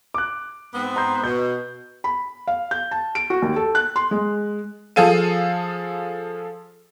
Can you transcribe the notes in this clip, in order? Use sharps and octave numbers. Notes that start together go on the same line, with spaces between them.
D6 F#6
G#2 B3 C4
A#5 C6 G6
B2 G6
B5
F5
G6
A5
D7
F#4
D#2
A4
F#6
C6
G#3
F3 G#4 A4 F5 D#7